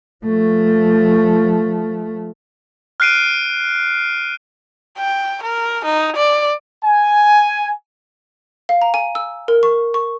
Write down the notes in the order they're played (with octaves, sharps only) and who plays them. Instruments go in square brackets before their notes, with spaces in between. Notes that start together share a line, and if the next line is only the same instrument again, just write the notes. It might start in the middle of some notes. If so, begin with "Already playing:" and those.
[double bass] F3 A3
[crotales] F6 F#6 C7 D7 D#7
[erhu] G5
A#4
D#4
D5
[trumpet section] G#5
[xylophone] F5
A#5
G#5
E6
A#4
C#6
C#6